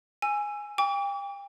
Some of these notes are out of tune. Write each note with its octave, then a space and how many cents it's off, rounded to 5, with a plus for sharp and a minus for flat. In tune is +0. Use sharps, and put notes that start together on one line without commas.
G#5 -5 E6 +25
G5 +35 D6 -40